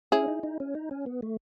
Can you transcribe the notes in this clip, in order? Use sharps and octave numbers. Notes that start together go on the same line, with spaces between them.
C#4 E4 G#4
D#4
D#4
C#4
D#4
C#4
B3
A3